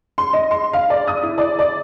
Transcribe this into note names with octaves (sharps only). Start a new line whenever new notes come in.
C6
D#5
C6
F5
D5
D#6
E4
D5
D5